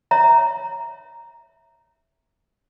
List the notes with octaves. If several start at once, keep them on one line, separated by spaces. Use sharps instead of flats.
C#5 E5 A#5